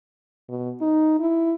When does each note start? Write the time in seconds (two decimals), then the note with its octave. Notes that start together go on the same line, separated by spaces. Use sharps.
0.49 B2
0.82 D#4
1.20 E4